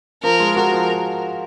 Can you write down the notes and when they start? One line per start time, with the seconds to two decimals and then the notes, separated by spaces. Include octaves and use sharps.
0.23 F3 A#4
0.40 G#3
0.56 F#4 A#4
0.73 F3